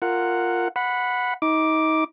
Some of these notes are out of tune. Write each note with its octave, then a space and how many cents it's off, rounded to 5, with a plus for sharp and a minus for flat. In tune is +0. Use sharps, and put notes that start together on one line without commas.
F4 +0 A#4 -15 F#5 +0
F#5 -15 B5 +0
D#4 +30 D6 +0